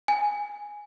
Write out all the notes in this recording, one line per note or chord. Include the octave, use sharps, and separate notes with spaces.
G#5